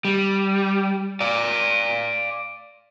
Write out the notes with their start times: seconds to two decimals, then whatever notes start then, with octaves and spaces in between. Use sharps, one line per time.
0.05 G3
1.21 D5 F5